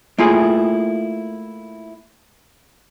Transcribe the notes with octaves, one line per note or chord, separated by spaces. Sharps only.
A3 A#3 E4 F4 G#4